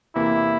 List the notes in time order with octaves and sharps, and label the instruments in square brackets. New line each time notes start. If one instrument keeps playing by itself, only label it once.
[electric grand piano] E2 C3 E3 A#3 [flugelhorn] E4